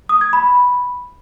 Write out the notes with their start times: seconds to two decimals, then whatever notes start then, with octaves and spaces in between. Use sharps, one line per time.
0.09 D#6
0.21 G#6
0.33 B5